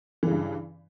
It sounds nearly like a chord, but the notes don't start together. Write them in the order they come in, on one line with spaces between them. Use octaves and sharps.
E3 C#3 G2